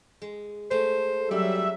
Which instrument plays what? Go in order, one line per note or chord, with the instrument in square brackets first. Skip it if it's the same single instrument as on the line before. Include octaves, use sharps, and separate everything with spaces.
[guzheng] G#3
[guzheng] G#3 A3 [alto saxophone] C5
[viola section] F#3 E5 [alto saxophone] G3 [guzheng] C#4